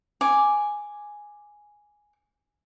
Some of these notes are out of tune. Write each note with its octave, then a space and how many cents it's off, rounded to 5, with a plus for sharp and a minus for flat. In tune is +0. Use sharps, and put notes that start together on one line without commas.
G#5 +0 D6 +0